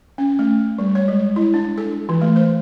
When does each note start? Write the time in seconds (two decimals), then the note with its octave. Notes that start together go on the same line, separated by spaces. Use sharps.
0.18 C#4
0.39 A3
0.79 G3
0.95 C#5
1.08 G#3
1.36 E4
1.54 D4
1.78 A4
2.09 E3
2.22 A3
2.36 C5